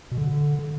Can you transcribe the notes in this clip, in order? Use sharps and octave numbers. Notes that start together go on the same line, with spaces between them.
B2
D3
D3